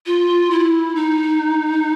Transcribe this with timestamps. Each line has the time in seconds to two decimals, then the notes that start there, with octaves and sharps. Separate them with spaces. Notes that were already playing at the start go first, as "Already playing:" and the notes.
0.06 F4
0.50 E4
0.95 D#4